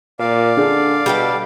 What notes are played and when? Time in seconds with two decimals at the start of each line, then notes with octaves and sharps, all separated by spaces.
0.19 A#2 D5 F5
0.57 D3 D4 G#4
1.06 B2 G3 G4 A4